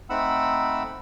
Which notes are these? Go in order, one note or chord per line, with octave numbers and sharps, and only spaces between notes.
A3 C4 D#4 F#5 B5 E6